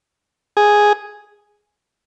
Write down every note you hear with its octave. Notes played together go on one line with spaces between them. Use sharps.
G#4